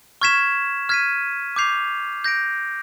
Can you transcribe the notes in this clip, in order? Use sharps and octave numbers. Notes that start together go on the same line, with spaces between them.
C#6 F6 G#6 B6 E7
F6 G#6 B6 D#7
D6 G6 C7 F7
G6 A#6 D7